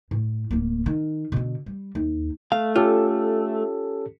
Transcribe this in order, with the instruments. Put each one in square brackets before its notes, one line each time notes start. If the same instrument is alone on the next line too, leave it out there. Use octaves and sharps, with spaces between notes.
[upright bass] A2
D1 A#3
D#3
B2 D3
G3
D#2
[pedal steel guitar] A3 [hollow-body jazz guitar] F5
[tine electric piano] C#4 G4 A4 [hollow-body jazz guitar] F4